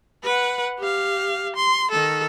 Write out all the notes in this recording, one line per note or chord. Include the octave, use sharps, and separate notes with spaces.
B4 F#5
G4 F5
C6
D#3 A4